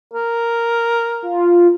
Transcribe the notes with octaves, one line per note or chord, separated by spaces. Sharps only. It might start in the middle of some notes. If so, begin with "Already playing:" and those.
A#4
F4